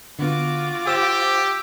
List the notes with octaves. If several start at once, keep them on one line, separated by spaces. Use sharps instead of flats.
D3 B3 F4 F#4 D6
G4 C5 E6 E7